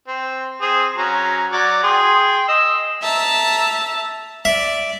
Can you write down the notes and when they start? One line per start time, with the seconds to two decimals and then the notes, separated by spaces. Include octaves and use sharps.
0.08 C4
0.61 C4 G#4
0.97 F#3 C#4 A#5
1.52 F#3 D5
1.83 G#4 G5 C6
2.48 D#5 E6
3.02 E5 A5 A#5
4.45 D5 E5